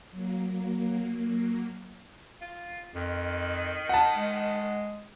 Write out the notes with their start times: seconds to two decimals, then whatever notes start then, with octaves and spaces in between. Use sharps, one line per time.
0.11 F#3 A#3
2.41 F4
2.95 F2 D#3
3.89 F#5 A5
4.16 G#3